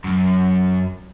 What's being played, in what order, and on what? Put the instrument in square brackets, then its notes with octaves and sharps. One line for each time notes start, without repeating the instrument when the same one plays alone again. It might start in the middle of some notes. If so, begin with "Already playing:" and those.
[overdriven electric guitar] F#2